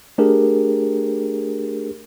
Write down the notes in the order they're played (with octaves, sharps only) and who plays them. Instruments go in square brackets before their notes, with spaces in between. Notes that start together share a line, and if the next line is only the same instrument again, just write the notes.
[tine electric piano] A3 D4 G4 G#4 A#4